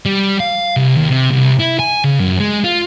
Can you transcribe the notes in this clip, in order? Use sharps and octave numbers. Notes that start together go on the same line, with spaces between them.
G3
F5
C2
D#2
C3
C2
E4
G#5
C#3
F#2
G#3
F4